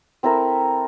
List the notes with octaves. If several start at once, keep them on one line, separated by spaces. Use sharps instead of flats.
C4 E4 A4 A#4